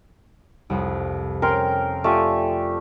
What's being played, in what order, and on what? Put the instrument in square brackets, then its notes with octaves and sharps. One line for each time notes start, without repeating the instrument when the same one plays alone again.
[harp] C2 F2
[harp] C#4 [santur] A#4 G5 C6
[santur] A3 F4 G4 [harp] D5 G#5